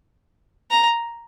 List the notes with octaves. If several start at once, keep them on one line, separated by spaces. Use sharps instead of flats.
A#5